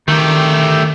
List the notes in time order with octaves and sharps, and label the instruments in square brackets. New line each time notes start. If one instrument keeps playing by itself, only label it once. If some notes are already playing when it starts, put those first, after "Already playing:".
[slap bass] D#3 [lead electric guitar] A3 G4